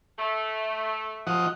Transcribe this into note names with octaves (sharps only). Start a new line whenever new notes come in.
A3
F3 D#5 F#5